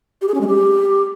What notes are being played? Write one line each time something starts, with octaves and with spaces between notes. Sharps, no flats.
G4
G#4
C#4
G#3
G4